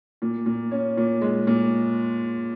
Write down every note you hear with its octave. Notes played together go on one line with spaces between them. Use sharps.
A#2
A#2
C#4
A#2
G#3
A#2